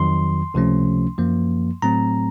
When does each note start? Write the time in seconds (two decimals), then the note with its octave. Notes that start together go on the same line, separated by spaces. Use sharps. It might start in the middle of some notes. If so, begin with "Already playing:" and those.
Already playing: F2 D#3 F#3 C6
0.54 C#2 C3 F3 A3 C#4
1.18 F#2 F3 A#3
1.82 A2 F#3 A3 C4 A#5